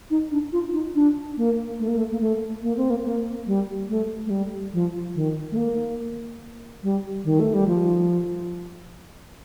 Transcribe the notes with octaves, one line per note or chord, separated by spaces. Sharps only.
D#4
D4
F4
D#4
D4
A#3
A3
A#3
A3
A#3
A3
A#3
C4
A#3
A#3
G3
A3
A3
G3
F3
D#3
A3
A#3
G3
D#3
A3
G3
F3